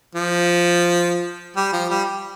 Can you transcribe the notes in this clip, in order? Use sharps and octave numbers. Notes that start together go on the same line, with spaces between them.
F3
G3
F3
G3